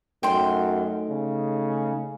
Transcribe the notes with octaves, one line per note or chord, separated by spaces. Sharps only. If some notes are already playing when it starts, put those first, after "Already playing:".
F#2 A3 D#4 G5 C6
C#3